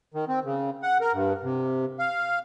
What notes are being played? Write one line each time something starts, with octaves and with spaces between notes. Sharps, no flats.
D#3
C4
C#3
F#5
A#4
G2
C3
F5